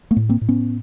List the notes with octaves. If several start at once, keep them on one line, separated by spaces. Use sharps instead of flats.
A3 B3
A2
A#3 C4
A2
B3 C#4